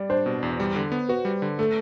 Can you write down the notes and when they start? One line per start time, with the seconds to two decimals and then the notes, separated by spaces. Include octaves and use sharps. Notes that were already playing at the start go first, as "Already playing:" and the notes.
Already playing: G3 D5
0.10 D4 C5
0.26 B2
0.43 E2
0.60 G3
0.76 D3
0.92 B3
1.09 F#4 B4
1.25 G3
1.42 D3
1.58 A3 A4